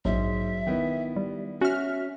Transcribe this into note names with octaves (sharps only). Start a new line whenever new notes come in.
A#1 G#2 F#3 E5
D#3 B3 E4
G3
C#4 F#4 E5 F6